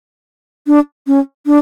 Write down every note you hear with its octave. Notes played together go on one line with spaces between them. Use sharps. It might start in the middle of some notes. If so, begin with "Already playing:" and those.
D4
C#4
D4